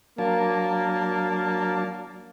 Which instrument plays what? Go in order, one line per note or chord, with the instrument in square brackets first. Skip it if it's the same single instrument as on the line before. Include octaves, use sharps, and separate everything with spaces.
[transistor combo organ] F#3 D4 A5 [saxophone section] A#3